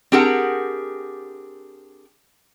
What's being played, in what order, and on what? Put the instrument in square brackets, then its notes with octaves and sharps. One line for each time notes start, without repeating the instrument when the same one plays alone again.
[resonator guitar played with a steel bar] C4 D4 G4 G#4 A#4 F#5